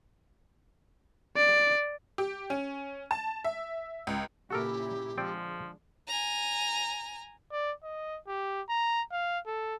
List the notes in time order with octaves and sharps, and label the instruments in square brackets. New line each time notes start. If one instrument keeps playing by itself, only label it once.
[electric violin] D5
[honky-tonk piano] G4
C#4
A5
E5
C#2
[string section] A#2 C#3 E4 [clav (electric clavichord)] F#4 A4 A#4 [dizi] G4
[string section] D3 G#3 [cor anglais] F3 [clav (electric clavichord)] C4 D5 G5
[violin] G#5 A#5
[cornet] D5
D#5
G4
A#5
F5
A4